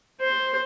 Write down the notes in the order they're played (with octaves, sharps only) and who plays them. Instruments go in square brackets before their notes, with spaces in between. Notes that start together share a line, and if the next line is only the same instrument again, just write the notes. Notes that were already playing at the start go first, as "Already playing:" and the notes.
[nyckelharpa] C5